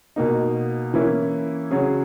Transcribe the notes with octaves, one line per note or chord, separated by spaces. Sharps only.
B2 A#3 D#4
E3 A#3 C#4 E4
C#3 F#3 C#4 G#4